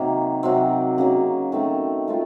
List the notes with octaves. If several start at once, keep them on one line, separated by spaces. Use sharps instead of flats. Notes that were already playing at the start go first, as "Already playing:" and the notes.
Already playing: C3 D#3 F#3 A#3
C3 F#3 C4
C#3 F#3 A#3
D#3 A3 C4
A3 C4 F4